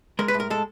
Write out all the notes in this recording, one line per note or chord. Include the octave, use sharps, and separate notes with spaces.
G#3 A#4
B4
A2
A#4
G#3 A4